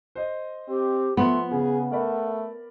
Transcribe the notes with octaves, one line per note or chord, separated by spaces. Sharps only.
C5 D#5
C4 G4
F3 A3 B3 C6
C#3 G#4 F#5
A3 A#4 D5 B5